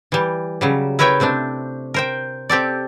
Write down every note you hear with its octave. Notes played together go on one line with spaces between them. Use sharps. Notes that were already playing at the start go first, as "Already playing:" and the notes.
E3 G3
C#3 F#3 G3
E4 A#4 B4 C#5 E5 G5
C3 A3 C4 D4
A#4 C5 G5
C4 G4 A4 D5